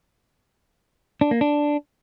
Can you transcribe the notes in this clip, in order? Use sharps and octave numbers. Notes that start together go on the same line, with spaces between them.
D4
A#3
D4